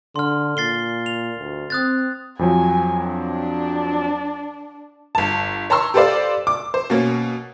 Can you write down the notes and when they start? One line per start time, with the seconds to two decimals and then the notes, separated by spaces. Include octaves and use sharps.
0.16 D3 C6 F6
0.57 A#2 A6 C7 G7
1.06 F7
1.39 D2
1.70 C4 D#6 F#6 A6
2.39 F2 F3 F#3 G#5
3.08 D4
5.15 G1 A5
5.70 C#5 A5 A#5 C6 C#6 E6
5.94 G4 A4 B4 C5 D5 F5
6.47 D6
6.74 C5
6.90 B2 A#3 C#4